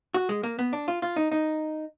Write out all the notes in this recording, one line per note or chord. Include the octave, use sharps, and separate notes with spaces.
F#4
G#3
A#3
B3
D4
F4
F4
D#4
D#4